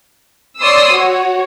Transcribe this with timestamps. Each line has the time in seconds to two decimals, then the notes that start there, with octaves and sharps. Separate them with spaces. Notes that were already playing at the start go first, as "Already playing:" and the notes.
0.60 C#5 D5 C6 D#6 E6
0.93 F#4 C#5